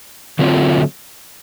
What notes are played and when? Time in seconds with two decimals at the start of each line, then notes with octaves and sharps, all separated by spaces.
0.39 D3 F#3 A3 C4 F4